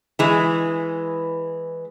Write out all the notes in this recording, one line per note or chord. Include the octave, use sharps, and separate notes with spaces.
E3 G#3